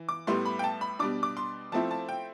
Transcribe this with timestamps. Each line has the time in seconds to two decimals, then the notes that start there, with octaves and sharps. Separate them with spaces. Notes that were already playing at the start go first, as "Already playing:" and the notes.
Already playing: E3
0.09 D6
0.27 A2 G3 B3 E4 C6
0.46 B5
0.59 G5
0.64 A5
0.81 B5
0.99 B2 G3 D4 D6
1.23 D6
1.37 C6
1.72 F3 A3 C4 E4 A5
1.91 A5
2.09 G5